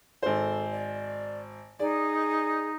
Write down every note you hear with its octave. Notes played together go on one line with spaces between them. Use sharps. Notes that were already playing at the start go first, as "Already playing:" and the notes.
G#1 A4 C5
D5
D#4 G#4 D5